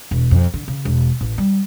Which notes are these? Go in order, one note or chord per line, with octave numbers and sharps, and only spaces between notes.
E1
F2
D3
C#3
E1
A1
G3